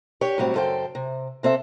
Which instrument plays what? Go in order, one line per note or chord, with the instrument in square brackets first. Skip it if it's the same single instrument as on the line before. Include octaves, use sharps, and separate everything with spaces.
[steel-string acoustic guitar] D4 G4 C#5
A2 F#3 G3 C4 C#5
F#2 C#3 A4 C5 G5
C3
C3 C4 A4 E5